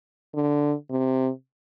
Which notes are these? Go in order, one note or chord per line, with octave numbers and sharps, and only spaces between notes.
D3
C3